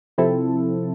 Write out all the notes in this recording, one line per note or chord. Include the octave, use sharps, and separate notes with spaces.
C3 F3 C4 E4 A4